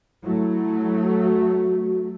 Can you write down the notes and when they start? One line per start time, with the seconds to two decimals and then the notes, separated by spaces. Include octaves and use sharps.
0.24 F#3 A3 E4
1.23 F#4